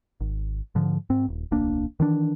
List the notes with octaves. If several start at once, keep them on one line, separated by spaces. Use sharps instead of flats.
G#1
G#2 D3 F3
G#2 C4
D#1
D1 B1 A#3 D4
D#3 E3 D4